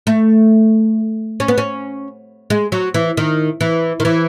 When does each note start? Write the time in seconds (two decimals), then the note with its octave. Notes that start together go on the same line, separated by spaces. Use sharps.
0.07 A3
1.40 C#4
1.48 B3
1.58 C#4
2.50 G#3
2.72 F#3
2.94 E3
3.17 D#3
3.61 E3
4.00 D#3
4.05 E3